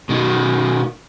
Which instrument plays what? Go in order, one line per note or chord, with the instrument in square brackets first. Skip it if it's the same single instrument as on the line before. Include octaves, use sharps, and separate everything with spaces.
[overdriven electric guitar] B2 D#3